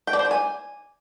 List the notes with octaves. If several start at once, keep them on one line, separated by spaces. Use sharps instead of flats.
G5
D5
C5
D5
G#5